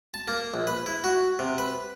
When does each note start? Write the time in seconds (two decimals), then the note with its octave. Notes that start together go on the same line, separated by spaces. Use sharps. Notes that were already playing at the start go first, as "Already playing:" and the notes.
0.14 A5
0.28 A#3
0.54 A#1
0.67 B4
0.86 E4
1.04 F#4
1.39 C3
1.58 B4